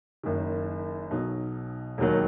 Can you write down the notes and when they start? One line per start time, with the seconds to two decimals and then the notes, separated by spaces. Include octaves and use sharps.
0.24 F#1 F#2 D#3
1.11 B1 B2 F#3 D#4
1.98 E1 D#2 D#3 F#3